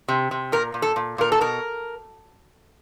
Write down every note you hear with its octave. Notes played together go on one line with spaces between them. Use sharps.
C3
C3
A#2 A#4
A#2
A4
A#2
A#2 A#4
A4
B2 A#4